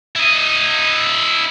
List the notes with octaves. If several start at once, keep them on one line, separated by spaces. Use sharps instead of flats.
E4 D#5